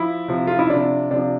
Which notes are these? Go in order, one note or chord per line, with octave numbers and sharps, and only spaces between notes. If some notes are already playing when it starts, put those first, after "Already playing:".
Already playing: F3 E4
C3 F3
F4
E4
C3 F3 D4
C3 F3 D4